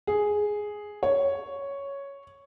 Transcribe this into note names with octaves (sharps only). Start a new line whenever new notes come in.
G#4
C#5